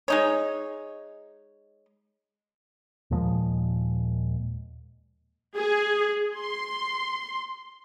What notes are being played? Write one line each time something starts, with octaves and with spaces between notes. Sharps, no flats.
G#3 D#4 C#5
D#2 A#2 F3 G#3
G#4
C6